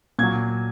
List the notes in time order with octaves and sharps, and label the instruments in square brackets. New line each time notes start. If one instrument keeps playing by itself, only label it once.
[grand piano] A#2 F#3 G#6